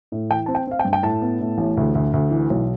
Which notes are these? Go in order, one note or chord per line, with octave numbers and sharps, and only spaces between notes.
A2
E3 G5
C4 A5
G5
C4 F5
G5
G2
G5
A2 A5
B3
A2
A1
D2
D2
D2
E3
B1